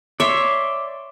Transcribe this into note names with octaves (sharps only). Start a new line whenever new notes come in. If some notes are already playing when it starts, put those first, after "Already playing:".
C#5 D5 E5 C6